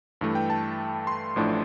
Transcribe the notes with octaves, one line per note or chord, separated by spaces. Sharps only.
G2 E3 A3
G5
A5
C6
A1 A2 F3 A3 D4